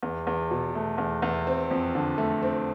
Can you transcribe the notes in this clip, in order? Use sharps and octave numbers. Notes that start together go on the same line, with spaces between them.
E2
E2
B2
A3
E2
E2
C4
F2
D3
A3
C4